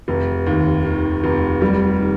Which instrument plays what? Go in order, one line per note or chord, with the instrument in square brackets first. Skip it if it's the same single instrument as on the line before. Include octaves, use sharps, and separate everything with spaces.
[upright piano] F1
D#2
D#3
F1
G3
D#3